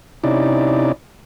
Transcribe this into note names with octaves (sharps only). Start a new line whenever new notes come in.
C3 C#4 D#4 E4 D5